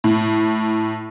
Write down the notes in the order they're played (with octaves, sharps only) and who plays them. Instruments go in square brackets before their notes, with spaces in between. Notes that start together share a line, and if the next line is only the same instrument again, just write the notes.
[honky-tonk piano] A2